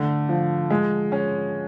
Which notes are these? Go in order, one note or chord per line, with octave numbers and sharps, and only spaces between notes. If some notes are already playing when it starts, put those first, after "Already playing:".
Already playing: D3 A3
F3
G#3
C#4